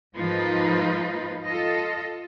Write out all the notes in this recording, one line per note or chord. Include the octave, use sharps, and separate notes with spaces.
G#2 F3 A#3 D#4 F4 B4
F4 A4 D#5